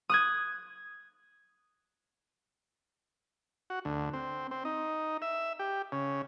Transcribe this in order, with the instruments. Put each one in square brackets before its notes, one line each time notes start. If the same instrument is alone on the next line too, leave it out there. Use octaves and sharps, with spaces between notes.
[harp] D#6 F#6 G#6
[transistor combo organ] F#4
D2
C4
C4
D#4
E5
G4
C#3